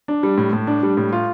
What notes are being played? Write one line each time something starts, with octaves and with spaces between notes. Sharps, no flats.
D4
G3
A2
A2
D4
G3
A2
F4